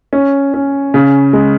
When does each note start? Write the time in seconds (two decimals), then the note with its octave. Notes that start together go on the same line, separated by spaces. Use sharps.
0.13 C#4
0.54 C#4
0.94 C#3
1.33 G#3